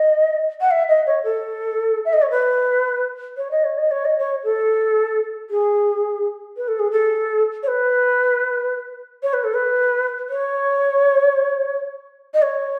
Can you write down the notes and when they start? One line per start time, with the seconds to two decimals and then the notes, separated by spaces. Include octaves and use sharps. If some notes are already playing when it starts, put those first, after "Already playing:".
Already playing: D#5
0.60 F#5
0.70 E5
0.88 D#5
1.06 C#5
1.24 A4
2.05 E5
2.13 D#5
2.22 C#5
2.30 B4
3.37 C#5
3.50 D#5
3.64 C#5
3.78 D#5
3.91 C#5
4.05 D#5
4.18 C#5
4.43 A4
5.50 G#4
6.56 B4
6.67 A4
6.79 G#4
6.91 A4
7.63 C#5
7.67 B4
9.22 C#5
9.33 B4
9.43 A4
9.53 B4
10.29 C#5
12.33 D#5
12.42 C#5